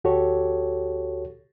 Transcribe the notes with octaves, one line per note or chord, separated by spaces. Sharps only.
D2 F#4 G4 A4 C#5